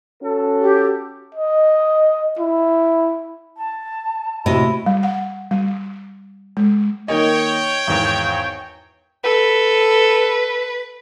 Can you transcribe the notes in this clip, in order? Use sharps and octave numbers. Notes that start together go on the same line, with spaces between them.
C#4 F#4 A4
G4
D#5
E4
A5
A2 C3 A3 E4 F#4 G4 D#5
G3
F#5
G3
G#3
D#3 A#3 C#5 D#5 G5
G#1 E2
A4 B4